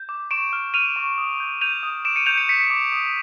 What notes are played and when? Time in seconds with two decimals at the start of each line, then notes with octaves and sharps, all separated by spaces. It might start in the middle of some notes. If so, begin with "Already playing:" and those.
Already playing: G6
0.09 D6
0.31 C#6 D7 E7
0.53 F6
0.74 F6 D#7 F7
0.96 C#6
1.18 D#6
1.40 G6
1.61 G6 D#7 F7
1.83 D#6
2.05 D6 D7 E7
2.16 C#7 D#7
2.26 G6 D#7 F7
2.37 C#7 D#7
2.48 G6 B6 C#7
2.70 D6
2.92 D#6